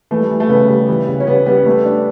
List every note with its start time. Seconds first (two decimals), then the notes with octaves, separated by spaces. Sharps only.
0.11 E3 A3
0.20 G3
0.30 E3
0.40 A3
0.49 C#3 B3
0.68 G3
0.89 E3
1.07 C#3
1.20 C#4
1.27 G3 B3
1.46 G3 B3
1.66 A3 B3
1.86 D4